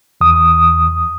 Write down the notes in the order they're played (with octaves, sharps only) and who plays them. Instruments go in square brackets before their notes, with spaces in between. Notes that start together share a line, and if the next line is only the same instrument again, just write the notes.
[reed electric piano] E2 D#6